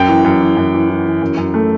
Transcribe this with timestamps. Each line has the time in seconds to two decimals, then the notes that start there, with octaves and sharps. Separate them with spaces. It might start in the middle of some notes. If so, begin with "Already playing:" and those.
Already playing: F#2 G5
0.09 E3
0.24 F#2
0.41 E3
0.57 F#2
0.74 E3
0.90 E3
1.05 E3
1.22 F#2
1.37 F#2
1.54 A3